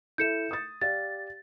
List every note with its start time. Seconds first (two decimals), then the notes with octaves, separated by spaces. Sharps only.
0.18 E4 A4 E5 G6 C#7 E7
0.51 D#6 A6
0.81 G4 D5 F5 A6